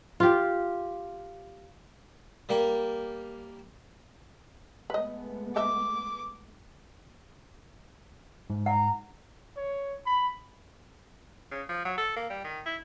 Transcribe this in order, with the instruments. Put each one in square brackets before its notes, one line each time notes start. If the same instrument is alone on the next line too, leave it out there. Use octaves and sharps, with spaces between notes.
[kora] F4 G4
[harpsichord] G3 A#3 A#4
[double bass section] G#3 A3 B3 [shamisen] B4 D#5
[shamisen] A4 D#5 E5 [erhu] D6
[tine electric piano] G#2
[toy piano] F#5 [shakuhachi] A#5
[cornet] C#5
B5
[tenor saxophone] C#3
F3
F#3
A4
A#3
G3
D#3
E4